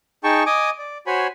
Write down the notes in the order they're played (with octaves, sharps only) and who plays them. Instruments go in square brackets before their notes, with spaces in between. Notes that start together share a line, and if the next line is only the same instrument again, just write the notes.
[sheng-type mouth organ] D#4 G#4 G5 A5 C#6
D#5 G#5 D6 D#6
D5
F#4 C5 C#5 G#5 B5